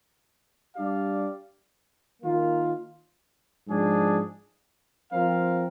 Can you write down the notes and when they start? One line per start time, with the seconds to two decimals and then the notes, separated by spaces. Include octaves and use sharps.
0.76 G3 D4 G4 D5 F5
2.21 D#3 A#3 F4 A#4
3.67 G#2 F3 G#3 D4 G#4
5.12 F3 C4 F4 A#4 F5